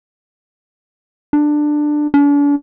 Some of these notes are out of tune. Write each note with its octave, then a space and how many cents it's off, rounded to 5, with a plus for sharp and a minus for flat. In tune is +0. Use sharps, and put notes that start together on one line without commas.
D4 +15
D4 -40